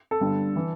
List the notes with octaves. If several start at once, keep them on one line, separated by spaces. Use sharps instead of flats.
A4
G1 G2 D3
E3